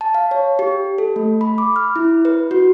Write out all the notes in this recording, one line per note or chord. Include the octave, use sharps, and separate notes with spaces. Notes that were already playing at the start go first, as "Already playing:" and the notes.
A5
F5
C#5
G4
A4
A3
B5
D6
F6
E4
B4
F#4